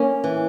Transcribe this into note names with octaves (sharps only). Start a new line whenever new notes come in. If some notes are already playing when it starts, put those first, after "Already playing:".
Already playing: A#3 C#4
E3